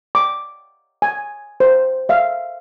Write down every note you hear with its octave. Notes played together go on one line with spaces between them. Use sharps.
D6
G#5
C5
E5 F5